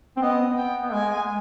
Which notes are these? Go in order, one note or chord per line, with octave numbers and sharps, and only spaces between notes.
C4
B3 D#5
G5
B3
G#3 G#5